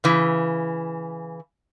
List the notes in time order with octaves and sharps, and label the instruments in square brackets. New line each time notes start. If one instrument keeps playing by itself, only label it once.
[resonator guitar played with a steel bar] C#3 E3